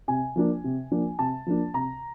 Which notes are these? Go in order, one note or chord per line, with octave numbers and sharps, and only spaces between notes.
C3 G#5
F3 A#3 D4
C3
F3 A#3 D4
C3 A5
F3 A#3 D4
C3 A#5